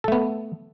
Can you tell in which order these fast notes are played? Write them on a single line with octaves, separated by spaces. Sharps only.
A4 A3 B3